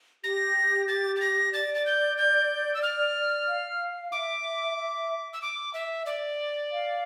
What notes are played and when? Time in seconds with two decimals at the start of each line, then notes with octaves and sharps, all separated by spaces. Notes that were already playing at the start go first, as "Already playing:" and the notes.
0.23 G4 A#6
0.88 A6
1.15 A6
1.20 A#6
1.52 D5 A6
1.74 A6
1.85 G6
2.17 G6
2.74 E6
2.82 F6
3.47 F5
4.12 E5 D6
4.76 E5
5.33 E6
5.42 D6
5.73 E5
6.06 D5
6.71 F5